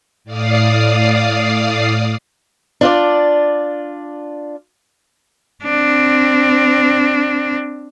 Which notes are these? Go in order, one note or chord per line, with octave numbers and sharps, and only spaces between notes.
A2 D5 F5 D#6 C7
D4 F4 D5
C4 D4